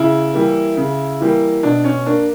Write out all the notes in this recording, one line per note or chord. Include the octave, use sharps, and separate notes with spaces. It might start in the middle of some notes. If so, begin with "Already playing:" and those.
Already playing: C#3 E4
E3 G3 A#3
C#3
E3 G3 A#3
B2 D4
C#4
A#3 D4